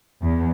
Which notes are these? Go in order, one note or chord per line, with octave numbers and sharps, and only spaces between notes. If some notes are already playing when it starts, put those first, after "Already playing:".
E2